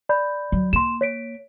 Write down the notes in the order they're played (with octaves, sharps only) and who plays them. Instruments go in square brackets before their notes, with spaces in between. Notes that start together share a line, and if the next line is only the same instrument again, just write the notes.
[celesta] D5 B5 G6
[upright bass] F#3
[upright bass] A#3 [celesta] C6 E7
[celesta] C#5 B6 D7